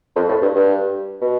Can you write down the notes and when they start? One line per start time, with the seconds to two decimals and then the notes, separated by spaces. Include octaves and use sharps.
0.16 F2
0.29 A2
0.42 G2
0.55 G2
1.21 B2